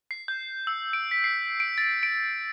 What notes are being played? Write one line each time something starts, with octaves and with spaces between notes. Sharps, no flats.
C7
G6
E6
D7
B6
C7
D7
A6
D7